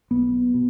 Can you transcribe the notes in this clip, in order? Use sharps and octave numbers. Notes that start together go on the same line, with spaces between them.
B1 B3
B2